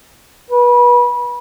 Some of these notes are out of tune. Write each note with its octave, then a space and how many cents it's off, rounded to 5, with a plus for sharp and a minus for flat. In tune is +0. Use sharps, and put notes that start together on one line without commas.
B4 -30